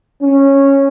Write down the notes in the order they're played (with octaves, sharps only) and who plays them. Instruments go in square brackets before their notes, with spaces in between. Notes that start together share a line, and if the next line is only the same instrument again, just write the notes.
[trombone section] C#4